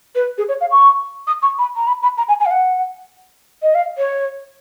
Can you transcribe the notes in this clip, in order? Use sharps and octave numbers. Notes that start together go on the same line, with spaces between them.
B4
G#4
C#5
F5
C#6
D#6
C#6
B5
A#5
B5
B5
A#5
G#5
G#5
F5
F#5
D#5
F5
C#5